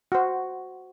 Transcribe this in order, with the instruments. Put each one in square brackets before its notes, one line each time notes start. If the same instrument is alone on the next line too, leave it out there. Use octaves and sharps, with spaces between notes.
[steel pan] F#4 C5